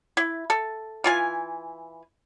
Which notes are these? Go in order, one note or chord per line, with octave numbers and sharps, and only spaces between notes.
E4
A4
E3 F4 G#5